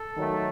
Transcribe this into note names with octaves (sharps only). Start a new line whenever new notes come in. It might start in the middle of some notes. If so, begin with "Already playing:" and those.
Already playing: A4
D#3 F#3 A3